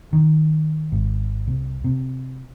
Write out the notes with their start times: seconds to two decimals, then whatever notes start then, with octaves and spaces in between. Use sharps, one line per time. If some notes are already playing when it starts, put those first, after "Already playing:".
0.13 D#3
0.92 G#1
1.47 C2
1.84 C3